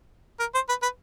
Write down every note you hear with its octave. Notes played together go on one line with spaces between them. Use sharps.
A#4
C5
B4
B4